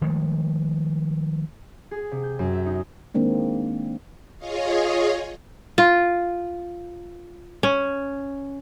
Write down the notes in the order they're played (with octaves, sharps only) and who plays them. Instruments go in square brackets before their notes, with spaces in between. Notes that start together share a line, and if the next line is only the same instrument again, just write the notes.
[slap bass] D#3 F3 G#3 A3
[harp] G#4
C3
G6
F#2
E5
D#4
[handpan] D#3 G#3 A#3 C4 D4
[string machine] F4 G#4 C#5 D#5 F5
[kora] F4
C#4